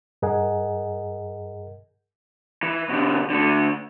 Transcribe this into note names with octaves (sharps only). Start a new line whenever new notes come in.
G2 G#4 A#4 D#5 F#5 G#5
E3
B2 D3
D3 A3